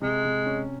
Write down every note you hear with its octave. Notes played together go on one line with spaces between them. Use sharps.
C3 G#3
C3
C#4